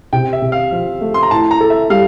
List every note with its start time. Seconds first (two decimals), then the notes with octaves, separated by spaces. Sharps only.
0.13 C3 G5
0.33 E5
0.42 C3
0.52 F5
0.72 F3
1.01 A3
1.14 C6
1.23 A#5
1.31 A2 A5
1.51 A#5
1.61 A4
1.70 E5
1.90 G3 F5